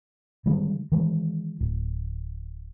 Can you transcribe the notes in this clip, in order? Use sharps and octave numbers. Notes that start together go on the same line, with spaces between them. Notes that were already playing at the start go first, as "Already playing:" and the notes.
D3 D#3 G3 G#3
D#3 E3 G#3
D1